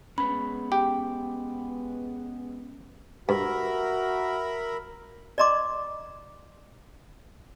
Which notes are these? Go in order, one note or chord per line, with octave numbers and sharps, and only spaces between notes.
G#3 B3 C#4 B4 C#5 B5
G4 G5
G2 F#4 A#4 E5 B5
D5 D#5 A#5 C6 D6